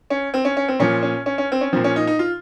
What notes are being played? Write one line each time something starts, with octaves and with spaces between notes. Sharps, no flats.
C#4
C4
C#4
C#4
C4
A#2 F3 C#4
C#4
C#4
C#4
C4
C#4
A#2 F3 C4
C#4
D#4
D#4
F4